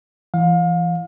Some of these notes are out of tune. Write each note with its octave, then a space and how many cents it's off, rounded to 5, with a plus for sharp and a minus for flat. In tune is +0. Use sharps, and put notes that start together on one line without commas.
E3 +35 F5 +30